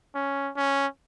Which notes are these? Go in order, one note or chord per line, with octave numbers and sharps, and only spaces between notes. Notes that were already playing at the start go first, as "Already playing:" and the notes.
C#4
C#4